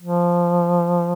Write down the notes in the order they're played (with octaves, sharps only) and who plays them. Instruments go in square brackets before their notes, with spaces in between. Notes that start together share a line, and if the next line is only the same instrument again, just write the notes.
[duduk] F3